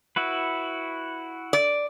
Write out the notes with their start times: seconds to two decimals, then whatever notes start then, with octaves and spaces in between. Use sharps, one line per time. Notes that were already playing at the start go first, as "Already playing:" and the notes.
0.16 E4 F#4 B4
1.53 D5